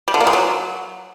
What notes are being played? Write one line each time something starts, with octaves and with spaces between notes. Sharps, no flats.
G3
D3
A#3
G#3
F#3